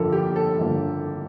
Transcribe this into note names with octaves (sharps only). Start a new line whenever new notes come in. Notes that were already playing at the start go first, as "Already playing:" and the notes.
Already playing: G1 F2 D3 F3 A#3 A4 A#4
G4
A4
G1 F2 D3 F3 A#3